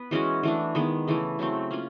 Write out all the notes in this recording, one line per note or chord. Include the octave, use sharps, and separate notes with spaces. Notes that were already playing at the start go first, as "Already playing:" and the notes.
Already playing: B3 B4
E3 G#3 C#4 F#4
E3 A3 D4
D#3 G#3 B3
C#3 E3 A3
C#3 F#3 A3 C4
A#3 C#4 F4